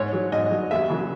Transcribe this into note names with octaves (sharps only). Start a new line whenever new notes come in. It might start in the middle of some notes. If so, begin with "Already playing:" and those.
Already playing: G#2 C#5
F#3
G#2 D#5
F#3
D#2 E5
C#3 F#3